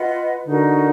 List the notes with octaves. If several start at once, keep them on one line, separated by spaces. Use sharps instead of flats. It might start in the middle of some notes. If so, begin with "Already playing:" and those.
Already playing: F4 B4 D#5 F#5
D3 D#4 F#4 A#4